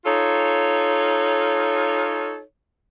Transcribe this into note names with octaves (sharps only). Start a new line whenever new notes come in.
D#4 F4 A4 C#5